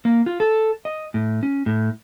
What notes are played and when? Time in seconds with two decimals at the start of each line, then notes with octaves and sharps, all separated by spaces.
0.05 A#3
0.26 F4
0.40 A4
0.85 D#5
1.14 A2
1.43 C#4
1.66 A2